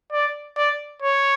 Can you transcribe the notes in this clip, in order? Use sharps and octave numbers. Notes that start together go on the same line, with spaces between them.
D5
D5
C#5